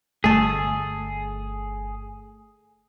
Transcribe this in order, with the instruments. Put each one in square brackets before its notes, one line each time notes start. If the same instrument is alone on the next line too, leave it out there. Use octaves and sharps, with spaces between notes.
[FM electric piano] G1 [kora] A3 A4 [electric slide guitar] G#4